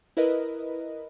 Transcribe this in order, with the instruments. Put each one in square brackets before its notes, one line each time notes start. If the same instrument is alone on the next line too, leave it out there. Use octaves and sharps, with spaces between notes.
[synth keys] E4 A#4 B4 D#5